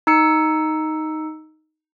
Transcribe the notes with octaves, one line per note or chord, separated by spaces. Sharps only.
D#4 E6 C#7